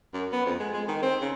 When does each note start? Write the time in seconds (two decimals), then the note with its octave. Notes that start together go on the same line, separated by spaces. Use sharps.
0.14 F#2
0.32 B3
0.46 F2
0.60 G#3
0.74 G#3
0.88 D#3
1.03 C4
1.21 C#3